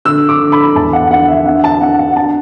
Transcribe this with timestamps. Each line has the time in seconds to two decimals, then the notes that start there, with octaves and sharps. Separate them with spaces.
0.05 D3 E6
0.28 D6
0.40 D3
0.52 B5
0.75 E2 A5
0.93 F#5
1.10 D4 F#5
1.28 E5
1.46 D4 F#5
1.64 A5
1.81 D4 F#5
1.99 F#5
2.16 D4 A5